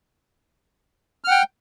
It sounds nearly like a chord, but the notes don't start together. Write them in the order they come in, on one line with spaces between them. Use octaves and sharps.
F6 F#5 G5